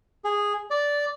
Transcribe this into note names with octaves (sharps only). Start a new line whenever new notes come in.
G#4
D5